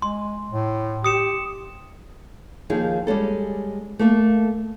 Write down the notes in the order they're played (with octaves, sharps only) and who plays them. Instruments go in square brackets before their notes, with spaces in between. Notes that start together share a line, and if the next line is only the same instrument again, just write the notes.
[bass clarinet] G#3 [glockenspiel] C6
[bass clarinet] A2
[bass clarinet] G4 [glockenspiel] D#6 C#7 E7
[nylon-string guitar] D#2 F3 D#4 G#4
G3 G#3 C#4 A4
A3 A#3 A4